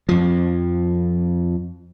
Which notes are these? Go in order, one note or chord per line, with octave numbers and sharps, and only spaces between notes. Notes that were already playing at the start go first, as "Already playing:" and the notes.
F2 F3